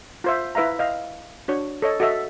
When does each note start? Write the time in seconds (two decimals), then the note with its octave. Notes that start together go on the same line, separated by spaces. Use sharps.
0.24 F4 C5 E5
0.55 E4 B4 E5 F5 A#5
0.79 D#5 F5
1.48 D4 F#4 C#5
1.82 A4 C#5 D#5
2.00 F#4 A4 D#5 E5